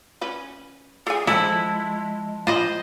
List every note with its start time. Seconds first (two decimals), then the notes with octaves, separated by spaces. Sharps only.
0.21 C#4 B4
1.07 G#4 A4 G#5
1.27 F3 G#3 E4 A4 A5
2.47 F4 C5 D#5 B5